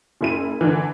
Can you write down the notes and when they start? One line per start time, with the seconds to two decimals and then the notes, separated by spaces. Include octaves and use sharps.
0.21 F#1 E4 D#7
0.61 D3 E3